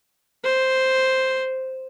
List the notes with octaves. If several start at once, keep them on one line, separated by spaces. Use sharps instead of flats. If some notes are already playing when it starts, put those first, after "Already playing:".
C5